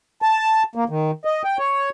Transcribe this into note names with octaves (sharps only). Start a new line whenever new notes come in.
A5
A#3
D#3
D#5
G5
C#5